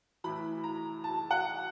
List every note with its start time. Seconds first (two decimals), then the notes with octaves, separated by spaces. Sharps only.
0.24 A2 E3 B5
0.63 A#5
1.04 A5
1.31 F#5